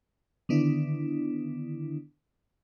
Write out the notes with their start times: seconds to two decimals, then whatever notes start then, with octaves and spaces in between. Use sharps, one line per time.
0.49 D3 D#3 B3 D4 E4